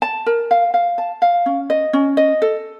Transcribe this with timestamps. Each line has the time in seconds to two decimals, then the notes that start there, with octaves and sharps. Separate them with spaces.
0.02 A5
0.26 A#4
0.51 F5
0.74 F5
0.98 A5
1.22 F5
1.46 C#4
1.70 D#5
1.93 C#4
2.17 D#5
2.42 A4